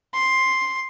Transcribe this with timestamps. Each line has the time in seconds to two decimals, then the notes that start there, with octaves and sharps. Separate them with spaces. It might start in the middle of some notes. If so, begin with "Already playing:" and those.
0.14 C6